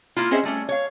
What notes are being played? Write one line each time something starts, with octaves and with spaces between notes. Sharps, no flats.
A#3 E4 F4
C4 C#4 G#4 C5 D#5 E5
G3 A3 C#4
C#5 F5